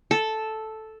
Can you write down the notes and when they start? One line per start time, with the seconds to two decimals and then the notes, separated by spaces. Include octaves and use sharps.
0.11 A4